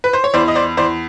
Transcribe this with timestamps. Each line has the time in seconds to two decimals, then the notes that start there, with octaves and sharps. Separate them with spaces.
0.04 B4
0.13 C5
0.24 C#5
0.34 E2 C5 D5
0.48 D#5
0.55 C5 D5
0.77 E2 C5 D5